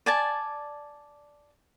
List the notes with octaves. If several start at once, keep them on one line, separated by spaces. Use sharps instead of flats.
D5 G#5 A5